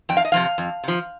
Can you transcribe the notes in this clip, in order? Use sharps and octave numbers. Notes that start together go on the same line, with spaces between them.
F2 G5
F5
D#5
C3 F3 F5
F2
C3 F3